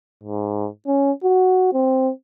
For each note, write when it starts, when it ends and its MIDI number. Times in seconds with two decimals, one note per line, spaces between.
0.23 0.68 44
0.87 1.11 61
1.24 1.71 66
1.73 2.11 60